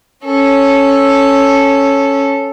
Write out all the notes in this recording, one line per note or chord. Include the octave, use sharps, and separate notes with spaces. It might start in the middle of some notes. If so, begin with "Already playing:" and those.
C#4 A4